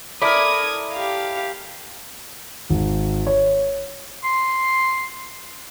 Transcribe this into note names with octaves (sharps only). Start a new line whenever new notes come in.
E4 A4 A#4 D5 B5 D6 D#6 G#6
G4 F5
G#1
C#5
C6